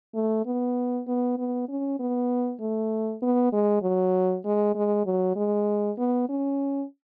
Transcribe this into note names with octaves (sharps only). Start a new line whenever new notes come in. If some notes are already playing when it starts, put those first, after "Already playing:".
A3
B3
B3
B3
C#4
B3
A3
B3
G#3
F#3
G#3
G#3
F#3
G#3
B3
C#4